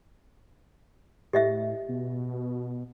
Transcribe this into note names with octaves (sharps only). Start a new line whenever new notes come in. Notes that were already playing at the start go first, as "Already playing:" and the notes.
A2 G4 D#5 E5
B2